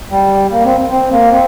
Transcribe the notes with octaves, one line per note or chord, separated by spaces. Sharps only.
G3
A#3
C4
C4
A#3
C4